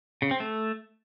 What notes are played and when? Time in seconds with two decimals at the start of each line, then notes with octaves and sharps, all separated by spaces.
0.22 C#3
0.31 C4
0.40 A3